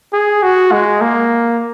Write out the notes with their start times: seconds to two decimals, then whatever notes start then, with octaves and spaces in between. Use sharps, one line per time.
0.13 G#4
0.43 F#4
0.72 G#3
1.01 A#3